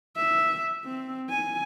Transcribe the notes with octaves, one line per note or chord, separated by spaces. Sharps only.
E5
C4
G#5